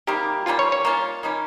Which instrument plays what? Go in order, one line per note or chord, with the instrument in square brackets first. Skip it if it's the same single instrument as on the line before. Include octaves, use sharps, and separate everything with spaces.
[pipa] C3 D#3 G3 A#3 [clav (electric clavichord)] G4
[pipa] G3 A#3 C#4 [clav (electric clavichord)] F4
[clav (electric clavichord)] C#5
C#5
[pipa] A#3 C#4 F4
D#3 G3 A#3 C#4